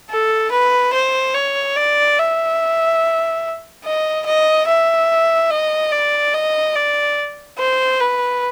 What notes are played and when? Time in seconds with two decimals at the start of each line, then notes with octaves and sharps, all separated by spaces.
0.10 A4
0.51 B4
0.93 C5
1.34 C#5
1.76 D5
2.18 E5
3.84 D#5
4.26 D#5
4.67 E5
5.51 D#5
5.92 D5
6.34 D#5
6.75 D5
7.58 C5
8.00 B4